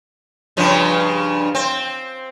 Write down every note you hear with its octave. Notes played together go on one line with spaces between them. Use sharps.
G2 C#3 F3
C4